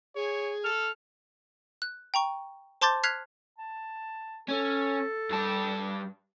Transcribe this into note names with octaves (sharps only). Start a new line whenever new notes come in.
G#4 C#5
A4 F6
F#6
G5 A#5 C#6
C5 A5 C6 D6 G6 A6
F6 F#6 G#6 B6 C7 F7
A5
C#4 A4
G2 A5